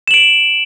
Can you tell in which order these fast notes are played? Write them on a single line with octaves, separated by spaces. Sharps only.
E7 F#7 D7